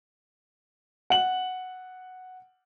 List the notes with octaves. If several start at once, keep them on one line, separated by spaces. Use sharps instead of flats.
F#5 F#7